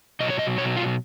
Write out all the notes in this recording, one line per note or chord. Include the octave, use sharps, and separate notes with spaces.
B2 F#3 D#5
C#5
D#5
B2 F#3 C#5
F4